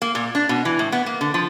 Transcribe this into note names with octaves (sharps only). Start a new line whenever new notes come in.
A#3
A#2
D4
B2
E3
A2
B3
A#3
D3
F3